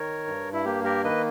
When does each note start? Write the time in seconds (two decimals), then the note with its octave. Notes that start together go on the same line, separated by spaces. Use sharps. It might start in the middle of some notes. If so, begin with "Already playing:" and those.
Already playing: D#3 A#4 C#5
0.26 G2
0.53 E4
0.65 A#3 G4
0.84 G4 A#4
1.04 D#3 B4 D#5